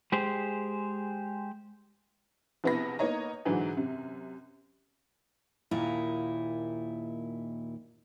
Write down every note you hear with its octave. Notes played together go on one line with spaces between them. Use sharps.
G#3 G4 G#4 C5
A#1 C3 B3 E4 B5 A#6
A#3 B3 D#4 C#5 D#5 A#5
G#2 D3 E3 F#3
F#2 C3
D#2 A#2 D#4 E4